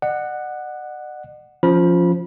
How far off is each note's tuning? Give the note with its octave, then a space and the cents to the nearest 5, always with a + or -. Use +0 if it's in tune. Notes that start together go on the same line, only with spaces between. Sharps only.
D5 +45 F#5 +0
F3 +0 C#4 +0 B5 -25